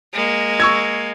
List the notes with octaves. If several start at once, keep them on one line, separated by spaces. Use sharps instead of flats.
G#3 A#3
C#6 E6 G#6